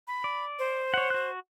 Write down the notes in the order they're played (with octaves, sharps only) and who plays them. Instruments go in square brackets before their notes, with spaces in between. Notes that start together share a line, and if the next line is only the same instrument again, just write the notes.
[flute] B5
[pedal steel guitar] D5
[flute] C5
[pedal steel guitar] C#5 F#5
F#4 F#6